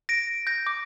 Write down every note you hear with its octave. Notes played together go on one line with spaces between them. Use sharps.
A#6 D7
G6 A#6
D6